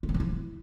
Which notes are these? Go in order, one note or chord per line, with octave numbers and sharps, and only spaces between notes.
A#3
D#3
F3
E4